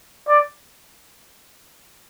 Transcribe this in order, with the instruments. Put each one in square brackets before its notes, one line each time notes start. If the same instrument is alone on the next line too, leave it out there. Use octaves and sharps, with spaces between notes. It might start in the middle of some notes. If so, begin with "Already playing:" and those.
[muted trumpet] D5